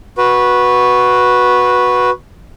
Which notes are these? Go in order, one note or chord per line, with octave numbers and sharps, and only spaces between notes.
F#4 B4